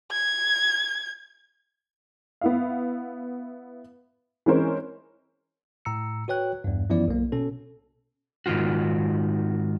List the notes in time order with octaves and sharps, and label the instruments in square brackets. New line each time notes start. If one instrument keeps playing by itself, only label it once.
[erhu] G#6
[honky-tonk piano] B3 E4 F5
E3 G#3 C4 C#4 A#4 C5
[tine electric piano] A2 A#5 E6 C#7
F#4 B4 C#5 G5 F#6
E2 G2
F#2 E3 F3 B3 E4 D5
B1 A#3
B2 C#4 A4
[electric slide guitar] G#2 D#3 A#3 F4 F#4